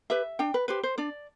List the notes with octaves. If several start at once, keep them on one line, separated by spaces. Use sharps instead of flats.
G4 B4 E5
D4 G5
B4
G4 B4 C5
C5
D4 D5